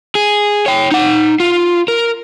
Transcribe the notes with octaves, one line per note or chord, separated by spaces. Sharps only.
G#4
C#5 G5
D#4 F#5
F4
A#4